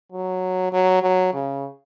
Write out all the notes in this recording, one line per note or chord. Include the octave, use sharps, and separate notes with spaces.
F#3
F#3
F#3
C#3